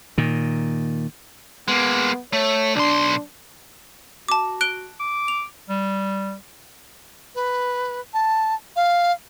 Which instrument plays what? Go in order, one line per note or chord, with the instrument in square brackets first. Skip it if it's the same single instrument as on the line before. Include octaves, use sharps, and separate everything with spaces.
[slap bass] A#2 D#3
[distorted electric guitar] G#3 A#3 [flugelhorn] B3
[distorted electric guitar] A3 [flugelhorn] C#5
[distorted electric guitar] B1 C6 [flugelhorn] D4
[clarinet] F#4 [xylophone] A5 D6
[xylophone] F#6 D7 G7
[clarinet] D6
[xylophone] F7
[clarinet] G3
[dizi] B4
A5
F5